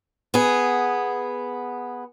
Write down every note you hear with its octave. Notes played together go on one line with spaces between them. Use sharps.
B3 G#4